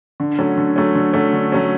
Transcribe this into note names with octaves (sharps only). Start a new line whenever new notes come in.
D3
F#3 A3 C#4
D3
F#3 A3 C#4
D3
F#3 A3 C#4
D3
F#3 A3 C#4